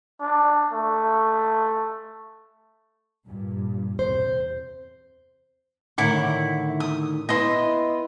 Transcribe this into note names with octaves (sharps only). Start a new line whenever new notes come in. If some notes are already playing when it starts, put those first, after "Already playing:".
D4
A3
G2 A#2
E2 C3 C5
A2 D3 D#3 E4 F#5 D6
D#6
B3 E4 B4 D#5 C6